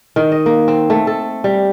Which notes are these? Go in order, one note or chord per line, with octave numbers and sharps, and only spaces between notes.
D#3
D#5
A#3
C4
A3
A4
G3